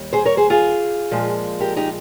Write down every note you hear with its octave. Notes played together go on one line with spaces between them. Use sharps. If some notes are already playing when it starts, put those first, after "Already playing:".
Already playing: D#2 G3
G#4 C5
A#4 C#5
G#4 C5
F4 G#4
A#2 F3 G#3
G4 A#4
D#4 G4